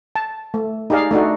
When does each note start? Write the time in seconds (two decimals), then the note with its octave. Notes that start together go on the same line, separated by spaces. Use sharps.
0.16 A5
0.54 A3
0.90 D#4 G4 G#4 D5 F5
1.11 A3 D4 D#4 F#4